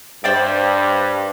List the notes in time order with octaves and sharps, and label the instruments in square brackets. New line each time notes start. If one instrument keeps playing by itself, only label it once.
[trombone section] G2 [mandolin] C5 D5 G5